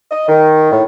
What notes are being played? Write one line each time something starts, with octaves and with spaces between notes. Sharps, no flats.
D#5
D#3
A2